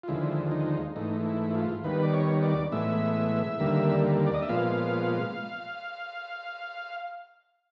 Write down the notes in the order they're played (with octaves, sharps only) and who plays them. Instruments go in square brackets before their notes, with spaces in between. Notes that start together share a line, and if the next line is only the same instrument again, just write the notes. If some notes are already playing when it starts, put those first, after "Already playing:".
[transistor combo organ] F4
D#2 D3 F3 G#3 E4
D#4
G#2 E3 A3 D#4
E4
E4
F4
D#2 D#3 G3 B3 B4
D5
C#5
D5
A2 E3 G#3 B3 E5
D#2 D3 G3 A#3
D5
D#5
E5
A#2 F3 G#3 B3 F5